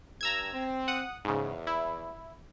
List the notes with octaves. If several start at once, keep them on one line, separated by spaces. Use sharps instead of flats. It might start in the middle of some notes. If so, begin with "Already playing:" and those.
G2 A#5 E6 G#6
C4
F#5 D#6
E2 G#2 C#3
E4